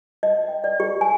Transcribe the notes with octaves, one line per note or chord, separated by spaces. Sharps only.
D#5
G5
D5
G4
G#5